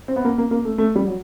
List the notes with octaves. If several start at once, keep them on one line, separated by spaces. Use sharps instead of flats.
C4
B3
A#3
A#3
A#3
A3
A3
G3
F#3